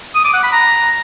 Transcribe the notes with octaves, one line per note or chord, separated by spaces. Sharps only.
D#6
D6
F#5
B5
A#5